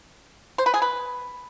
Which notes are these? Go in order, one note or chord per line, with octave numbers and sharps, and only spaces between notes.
C5
B4
G#4
B4